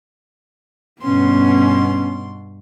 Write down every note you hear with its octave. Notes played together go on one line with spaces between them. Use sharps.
G2 B2 B3 C#4 C6